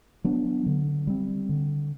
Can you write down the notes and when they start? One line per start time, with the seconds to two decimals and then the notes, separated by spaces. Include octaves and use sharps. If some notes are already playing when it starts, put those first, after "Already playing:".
0.24 F#3 B3 D4
0.66 D3
1.07 G3 C4
1.49 D3